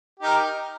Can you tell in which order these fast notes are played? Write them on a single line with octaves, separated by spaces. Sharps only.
G4 D#4 A#4